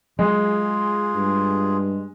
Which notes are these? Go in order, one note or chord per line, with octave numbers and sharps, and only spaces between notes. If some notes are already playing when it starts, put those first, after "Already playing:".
F#3 G#3 F4 G#4
G2